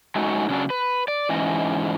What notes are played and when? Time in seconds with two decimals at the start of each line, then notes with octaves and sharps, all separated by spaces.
0.16 F#3 G#3 A3 C#4 D#4 F#4
0.49 C#3 F#3 C#4 D4
0.70 B4
1.08 D5
1.29 G#2 E3 C#4 D#5